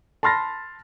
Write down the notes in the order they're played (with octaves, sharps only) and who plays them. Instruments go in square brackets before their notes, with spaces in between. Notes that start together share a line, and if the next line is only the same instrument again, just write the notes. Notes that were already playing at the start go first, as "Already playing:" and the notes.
[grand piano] A5 B5 C6 F6 A6 A#6